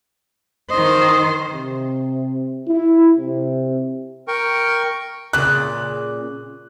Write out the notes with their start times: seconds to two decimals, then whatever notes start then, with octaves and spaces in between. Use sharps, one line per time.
0.70 D#3 C5 D#5
1.53 C3
2.68 E4
3.16 C3
4.28 A#4 G5 C#6
5.33 A#2 C#3 F#6